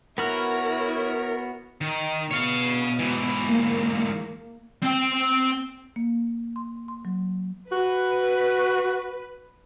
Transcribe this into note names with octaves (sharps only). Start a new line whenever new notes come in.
B3 E4 F#4 A#4 C#5 F6
D#3
B2 C#5 F5
G#2 E3
A#3
C4 G5
A#3
C6
C6
F#3
F#4 B4